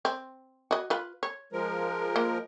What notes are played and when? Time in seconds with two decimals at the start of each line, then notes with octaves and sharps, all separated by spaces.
0.05 C4
0.71 F#4 D#5
0.90 F4 B4
1.23 C#5
1.52 F3 G#3 A#4
2.16 A#3